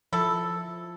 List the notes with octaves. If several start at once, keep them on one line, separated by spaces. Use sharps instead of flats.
F3 E4 A4